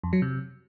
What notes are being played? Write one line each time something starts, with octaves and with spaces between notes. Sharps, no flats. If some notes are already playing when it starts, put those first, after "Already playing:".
F2
F#3
C3